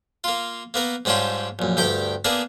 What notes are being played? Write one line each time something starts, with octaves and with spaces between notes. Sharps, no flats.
A#3 F4
A#3 B3 A#4
G#2 G3 C#4 D4 F4 D6
A#1 F#2
D2 G2 G4 G5 D6
A#3 B3 D4 G#4 A#4